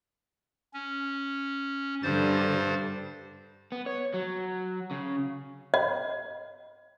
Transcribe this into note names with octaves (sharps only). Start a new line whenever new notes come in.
C#4
G2 D3 G3 C5 A6
B3
C#5
F#3
C#3
D#5